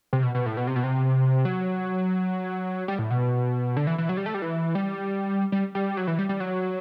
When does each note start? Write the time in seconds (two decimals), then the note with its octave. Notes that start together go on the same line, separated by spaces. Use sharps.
0.13 C3
0.23 B2
0.35 B2
0.46 A2
0.57 B2
0.67 C3
0.76 B2
0.84 C3
1.45 F#3
2.88 G3
2.99 A2
3.10 B2
3.77 D3
3.87 E3
3.98 E3
4.09 F#3
4.17 G3
4.26 A3
4.34 G3
4.42 E3
4.75 G3
5.52 G3
5.75 G3
5.97 F#3
6.07 E3
6.19 G3
6.29 G3
6.40 F#3